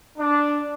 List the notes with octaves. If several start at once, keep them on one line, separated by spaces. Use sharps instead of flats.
D4